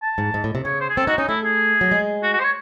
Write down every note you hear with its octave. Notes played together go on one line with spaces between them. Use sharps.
A5
G#2
G#2
A2
C3
C#3 C#5
C5
G#4
C4 A4
D#4 F#4
C#4 D#4
A3 E4
G#4
F#3
G#3
F#4
F#4
C5
C#5